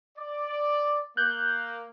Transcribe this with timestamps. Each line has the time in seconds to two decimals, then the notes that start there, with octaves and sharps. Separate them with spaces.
0.17 D5
1.17 A#3 F#6 G6